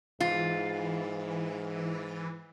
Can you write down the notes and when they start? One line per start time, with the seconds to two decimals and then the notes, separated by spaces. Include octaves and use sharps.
0.20 G#2 E3 F4